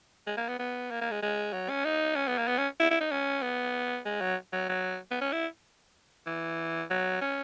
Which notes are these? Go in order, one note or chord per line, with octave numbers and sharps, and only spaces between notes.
G#3
A#3
B3
B3
A#3
A#3
G#3
G#3
F#3
C#4
D#4
C#4
B3
A#3
B3
C#4
E4
E4
D#4
C#4
B3
G#3
F#3
F#3
F#3
B3
C#4
E4
E3
F#3
C#4